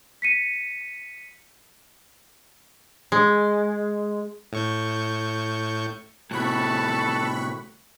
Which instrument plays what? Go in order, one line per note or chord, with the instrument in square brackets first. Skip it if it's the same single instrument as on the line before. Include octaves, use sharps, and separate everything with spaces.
[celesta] B6 C#7 D#7
[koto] G#3
[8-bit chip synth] A2 C#6 G6
[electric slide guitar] A2 C3 [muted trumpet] A4 [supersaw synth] B5 C#6 F#6